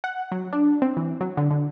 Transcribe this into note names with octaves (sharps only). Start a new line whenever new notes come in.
F#5
F#3
D4
C4
E3
F#3
D3
D3